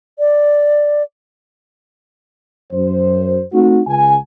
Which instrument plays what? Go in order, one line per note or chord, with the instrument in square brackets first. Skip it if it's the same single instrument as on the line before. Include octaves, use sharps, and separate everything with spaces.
[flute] D5
[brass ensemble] F#2 C5
A3 C4 D#4 F#4
C#2 G#5